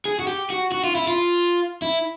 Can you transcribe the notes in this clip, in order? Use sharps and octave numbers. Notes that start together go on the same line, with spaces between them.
G#4
F#4
G4
F#4
F#4
F4
E4
F4
E4